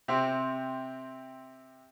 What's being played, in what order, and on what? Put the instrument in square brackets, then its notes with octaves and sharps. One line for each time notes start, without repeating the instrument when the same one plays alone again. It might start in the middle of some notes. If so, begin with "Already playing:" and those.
[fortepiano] C3 C4